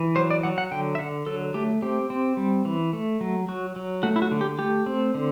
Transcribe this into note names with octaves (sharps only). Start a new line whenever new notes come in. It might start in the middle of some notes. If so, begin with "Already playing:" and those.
Already playing: E3
F#3 C5
D5
F#3 F#5
F#5
D3 G5
E5
D3 F#5
F#3 A4
A3 G4
C4 G4
C4
G3
E3
A3
F#3
F#3 F#4
F#3
A3 F#4
E4
F#4
D3
G4
A3 G4
C4
D3